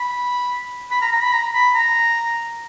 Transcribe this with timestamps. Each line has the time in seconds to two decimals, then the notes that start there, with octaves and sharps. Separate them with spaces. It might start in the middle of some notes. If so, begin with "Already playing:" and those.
Already playing: B5
0.91 B5
1.01 A#5
1.12 A#5
1.22 B5
1.33 A#5
1.54 B5
1.75 A#5